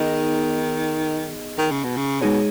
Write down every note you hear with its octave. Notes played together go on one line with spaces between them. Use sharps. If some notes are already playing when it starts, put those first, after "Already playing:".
Already playing: D#3 B3 D#4 G#4 D#5
D#3
C#3
B2
C#3
B2 G#3 D#4 G#4 C#5